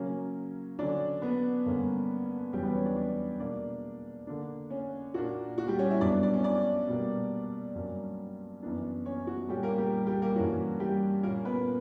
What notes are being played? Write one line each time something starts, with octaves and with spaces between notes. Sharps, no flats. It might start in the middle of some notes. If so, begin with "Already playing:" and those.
Already playing: C#3 F#3 A#3 C#4
D3 F#3 C#4 D4 D5
B3 B4
G2 D3 A#3 C#4
E2 C#3 F#3 G3 C#4 G4
B3 B4
C#4 C#5
D4 D5
D4 D5
B2 A#3 D4 D5
D3 A#3 D4
C#4 C#5
A#2 A#3 D4 F#4
F#4
G3 G4
C#4 C#5
E4 E5
G2 F#3 B3 D4 D5
D4 D5
D4 D5
C#4 C#5
D4 D5
B2 G3 A#3
G2 F#3 A#3 C#4
F#2 E3 B3 D4
C#4 C#5
F#4
A#2 G3 C#4 G4
A#3 A#4
G3 G4
G3 G4
A#3 A#4
G2 E3 A#3 C#4 F#4
G3 G4
A#2 A#3 C#4 A#4
B3 B4